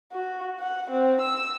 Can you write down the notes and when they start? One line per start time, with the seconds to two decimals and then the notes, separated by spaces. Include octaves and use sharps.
0.12 F#4
0.60 F#5
0.91 C4
1.21 E6